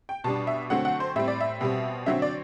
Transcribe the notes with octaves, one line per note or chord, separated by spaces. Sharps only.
G5
B2 G3 D4 A5
E5
D3 F#3 A3 C4 F#5
F#5
C5
A2 G3 C4 E5
D5
E5
B2 G3 C4
D3 F#3 C4 E5
D5